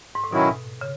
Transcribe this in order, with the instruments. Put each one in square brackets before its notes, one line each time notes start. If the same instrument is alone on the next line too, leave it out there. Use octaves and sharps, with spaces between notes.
[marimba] G#2
A2
[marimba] B2 [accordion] D#3 F#3 C#4 E4
[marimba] C#3